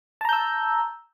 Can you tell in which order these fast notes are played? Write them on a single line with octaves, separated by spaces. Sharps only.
A5 A#5 G6 E6